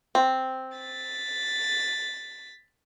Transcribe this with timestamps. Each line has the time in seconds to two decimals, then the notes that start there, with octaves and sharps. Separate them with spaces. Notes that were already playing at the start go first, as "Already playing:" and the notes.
0.15 C4
0.78 A6 B6